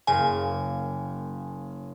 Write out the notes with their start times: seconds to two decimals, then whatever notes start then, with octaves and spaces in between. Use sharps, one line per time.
0.07 F#1 A#3 G#5